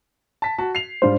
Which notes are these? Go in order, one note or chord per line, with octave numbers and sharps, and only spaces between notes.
A5 B6
F#4 A5
C7 F7
G#2 G3 D4 F4 C5